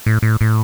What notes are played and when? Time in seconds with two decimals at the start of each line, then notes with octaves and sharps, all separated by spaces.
0.06 A2
0.23 A2
0.41 A2